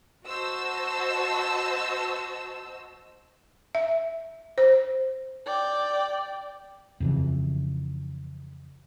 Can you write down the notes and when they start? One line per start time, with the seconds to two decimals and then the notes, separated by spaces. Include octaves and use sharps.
0.26 F#4 C5 D#5 A5 E6
3.75 E5
4.58 C5
5.46 D5 G5
7.00 F2 C#3 E3